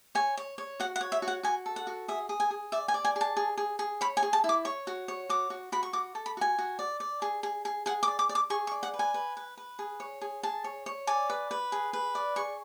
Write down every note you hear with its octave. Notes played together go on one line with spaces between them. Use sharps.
C#5 G#5
C#5
C#5
F#4 F#5
F#5
C#5
E5
F#4
F#5
F#4 G#5
A4
F#5
F#4
G#4 E5
G#4
G#5
G#4
D5 E5
G#5
D5
G#5
G#4
A5
G#4
G#4
G#4
C#5 B5
G#5
G#4
A5
E4
D6
C#5 C#6
F#4
C#5
F#4 D6
F#4
F#4 B5
C#6
F#4 D6
A4
B5
F#4 G#5
F#4
D5
D5
G#4
G#4
G#4
G#4 F#5
D6
D5
D6
D5
D6
G#4 C#6
C#6
D5
F#5
B4
G#5
B4
B4
B4
G#4
C#5
G#4
G#4 A5
C#5
C#5
D5 G#5
B4
B4
G#4
B4
D5
G#4 C#6